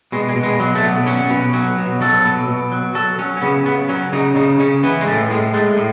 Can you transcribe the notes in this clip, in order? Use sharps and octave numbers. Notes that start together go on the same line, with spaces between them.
B2 G#3
G#3
B2
G#3
F#3
A3
B2
F#3 C#4
B2
F#3
B2
F#3 A4
B2
B2
F#3
F#3 A4
F#3 C#4
C#4
C#3 B3
C#3 B3
F#3 C#4
C#3 D#4
C#3 D#4
C#3 C#4
E3 B3
G#3
A2 A3
A2 G#3
G#3 A3
A2